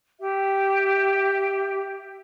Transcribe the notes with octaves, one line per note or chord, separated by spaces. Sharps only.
G4 E5